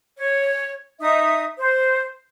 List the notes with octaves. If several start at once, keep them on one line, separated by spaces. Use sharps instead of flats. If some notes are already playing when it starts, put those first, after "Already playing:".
C#5
D#4 E5 D#6
C5